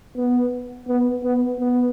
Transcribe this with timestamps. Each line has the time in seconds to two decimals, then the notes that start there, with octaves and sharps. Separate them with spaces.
0.17 B3
0.89 B3
1.24 B3
1.59 B3